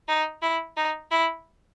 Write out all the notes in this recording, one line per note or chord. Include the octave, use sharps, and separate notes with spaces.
D#4
E4
D#4
E4